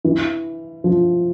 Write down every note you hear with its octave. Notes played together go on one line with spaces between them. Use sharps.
E3
F3